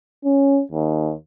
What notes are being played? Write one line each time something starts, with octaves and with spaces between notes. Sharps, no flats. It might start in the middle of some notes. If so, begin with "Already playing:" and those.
C#4
D#2